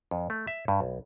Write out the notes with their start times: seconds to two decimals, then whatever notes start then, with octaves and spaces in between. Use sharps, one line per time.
0.11 F2
0.30 A3
0.47 E5
0.68 G2
0.80 B1